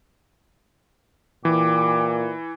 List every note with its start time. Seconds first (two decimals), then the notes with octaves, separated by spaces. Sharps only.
1.45 A#2 E3 G4